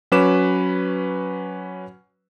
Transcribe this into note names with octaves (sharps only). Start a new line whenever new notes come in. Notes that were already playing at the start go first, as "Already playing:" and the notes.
F#3 C#4 B4 D6 E7